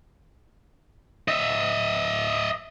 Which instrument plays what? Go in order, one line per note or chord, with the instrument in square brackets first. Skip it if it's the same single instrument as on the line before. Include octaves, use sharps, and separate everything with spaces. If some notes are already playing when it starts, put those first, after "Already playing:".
[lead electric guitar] D#5 E5